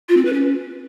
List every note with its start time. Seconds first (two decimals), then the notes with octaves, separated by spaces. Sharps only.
0.08 F4
0.17 C4
0.25 B4
0.33 C#4